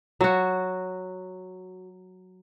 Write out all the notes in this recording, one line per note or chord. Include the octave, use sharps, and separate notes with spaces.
F#3 F#4